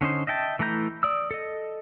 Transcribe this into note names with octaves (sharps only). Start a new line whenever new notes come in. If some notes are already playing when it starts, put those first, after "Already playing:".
D3 C#4 D#4 C5
D#5 E5 G5 A5
E3 A3 E4 A#5 G6
D5 D#6 E6
A4 D#5